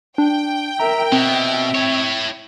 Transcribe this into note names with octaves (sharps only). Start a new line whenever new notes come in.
D4 G5
A#4 E5 A#5
B2 C4 E5
E4 C#5